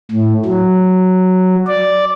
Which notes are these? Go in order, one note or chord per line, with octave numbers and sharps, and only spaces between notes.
A2
F#3
D5